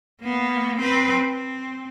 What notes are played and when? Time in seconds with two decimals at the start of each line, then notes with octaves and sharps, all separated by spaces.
0.21 A#3 B3
0.79 C4 B4
1.25 C4